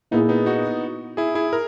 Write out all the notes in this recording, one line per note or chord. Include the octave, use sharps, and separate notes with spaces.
A#2 A#3 B3 D#4 E4 G#4
B3 D#4
D#4 F#4
E4 G#4
E4 G#4
A#4